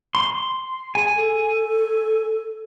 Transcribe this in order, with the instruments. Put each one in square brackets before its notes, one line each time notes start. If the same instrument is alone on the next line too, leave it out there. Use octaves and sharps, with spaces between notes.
[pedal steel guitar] C6
[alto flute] G#4 [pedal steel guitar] G#5
[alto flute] A4